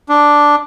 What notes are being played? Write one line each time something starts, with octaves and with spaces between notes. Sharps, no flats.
D4